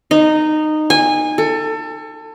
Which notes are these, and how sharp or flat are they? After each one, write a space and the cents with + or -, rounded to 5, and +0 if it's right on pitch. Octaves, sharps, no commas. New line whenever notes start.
D#4 -15
G#5 -20
A4 +25